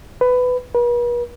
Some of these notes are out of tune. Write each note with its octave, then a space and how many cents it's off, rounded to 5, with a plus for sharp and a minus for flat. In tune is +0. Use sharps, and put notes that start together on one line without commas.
B4 +15
B4 -45